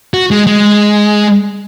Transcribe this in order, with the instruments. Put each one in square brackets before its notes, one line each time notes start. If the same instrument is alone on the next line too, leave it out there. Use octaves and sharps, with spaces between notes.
[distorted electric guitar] F#4
G#3
G#3